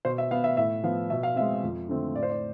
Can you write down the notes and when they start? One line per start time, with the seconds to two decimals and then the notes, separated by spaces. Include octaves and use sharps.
0.05 B2 C5
0.18 E5
0.31 B3 F5
0.44 E5
0.57 A2 E5
0.84 F3 B3 F5
1.10 B2 E5
1.23 F5
1.36 G#3 C4 E5
1.63 F2
1.89 D3 A3 C4
2.15 A2 D5
2.23 C5
2.30 D5